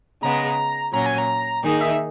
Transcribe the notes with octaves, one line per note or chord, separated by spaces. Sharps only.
C#3 G#3 B3 A#5
A#2 F#3 C#4 A#5
G#5
A#5
D#3 A#3 D#4 G#4
E5